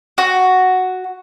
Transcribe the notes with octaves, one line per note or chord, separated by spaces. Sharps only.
F#4